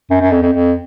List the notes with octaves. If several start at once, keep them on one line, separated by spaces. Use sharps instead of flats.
F#2
F#2
F2
F2
F2